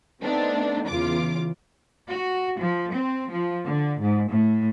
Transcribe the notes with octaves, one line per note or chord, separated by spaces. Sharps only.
A3 B3 C4 D4 D#4
E2 C#3 F4 D6
F#4
F3
C4
F3
D3
G#2
A2